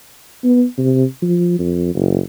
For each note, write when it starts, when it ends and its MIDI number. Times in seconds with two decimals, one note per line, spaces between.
0.44 0.65 59
0.78 1.05 48
1.22 1.56 53
1.59 1.90 41
1.95 2.19 30